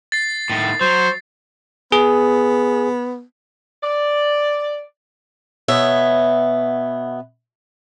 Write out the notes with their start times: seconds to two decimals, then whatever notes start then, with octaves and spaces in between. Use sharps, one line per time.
0.12 A6 C7
0.50 A2 D#3
0.81 F#3 C5
1.92 B3 G#4
3.83 D5
5.68 B2 B3 C#5 E5